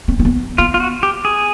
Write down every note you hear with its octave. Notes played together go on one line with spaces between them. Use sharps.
C4
C4
B3
B3 F4
F4
F#4
G4
G#4